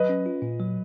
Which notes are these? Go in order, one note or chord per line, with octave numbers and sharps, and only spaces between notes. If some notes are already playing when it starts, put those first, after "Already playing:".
Already playing: F#3 B4 D#5
C#4
F4
A#2
F#3